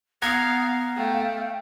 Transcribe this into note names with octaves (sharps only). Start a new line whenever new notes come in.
B3 F5 F#5 A#5 G#6
A3 F5 G5 F6